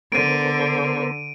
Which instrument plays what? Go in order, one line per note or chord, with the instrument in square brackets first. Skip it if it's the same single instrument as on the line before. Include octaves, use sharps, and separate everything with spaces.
[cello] D3 [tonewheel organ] B3 A#4 C5 [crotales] D7 D#7